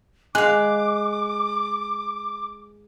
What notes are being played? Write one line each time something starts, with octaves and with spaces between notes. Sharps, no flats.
G#3 F5 G#5 D6 F#6